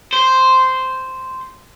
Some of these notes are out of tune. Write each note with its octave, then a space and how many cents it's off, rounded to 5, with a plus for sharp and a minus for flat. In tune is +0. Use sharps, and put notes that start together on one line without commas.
C5 -5